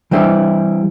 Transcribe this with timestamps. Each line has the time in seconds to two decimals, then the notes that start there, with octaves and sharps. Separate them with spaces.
0.11 E3 G3 C4 E4